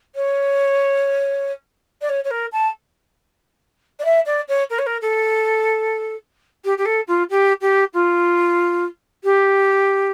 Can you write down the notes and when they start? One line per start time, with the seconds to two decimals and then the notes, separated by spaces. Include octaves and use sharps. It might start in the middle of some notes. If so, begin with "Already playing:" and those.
0.15 C#5
2.02 D5
2.09 C#5
2.24 C#5
2.31 A#4
2.52 A5
3.99 D5
4.05 E5
4.26 D5
4.49 C#5
4.70 A#4
4.79 C#5
4.86 A#4
5.02 A4
6.65 G4
6.78 G4
6.86 A4
7.08 F4
7.30 G4
7.61 G4
7.94 F4
9.24 G4